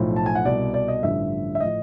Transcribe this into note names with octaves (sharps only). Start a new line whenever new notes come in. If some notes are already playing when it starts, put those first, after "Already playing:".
Already playing: B1 A2 F3
A5
G#5
F#5
C2 B2 D5
D5
D#5
A1 G2 D3 F3 E5
E5
A2 F3 D#5